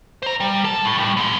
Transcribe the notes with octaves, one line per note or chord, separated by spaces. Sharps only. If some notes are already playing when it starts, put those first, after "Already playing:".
C5 A#5
G3
A4 A5
A2
A2 G3
B2 G#3